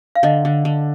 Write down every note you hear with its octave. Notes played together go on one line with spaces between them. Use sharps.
F5
D3 D#5
D3
D3